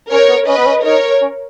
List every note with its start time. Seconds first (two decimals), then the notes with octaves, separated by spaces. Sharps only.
0.11 C#4 A#4 C#5
0.29 B3
0.48 C#4 B4 D#5
0.57 B3
0.66 C#4
0.85 D#4 A#4 C#5
1.22 C#4